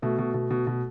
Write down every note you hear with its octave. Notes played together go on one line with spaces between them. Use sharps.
B2 A3
B2
B2
B2
B2